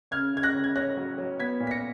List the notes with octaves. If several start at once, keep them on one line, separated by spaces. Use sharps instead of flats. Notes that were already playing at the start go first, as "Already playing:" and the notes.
C#3 F6 G#6
C#3 G#6
F#6 A#6
C#3
G#6
C#4 F#6 A#6
F#3
F#3
B3 G#6 B6
A#2
B6
A#6 C#7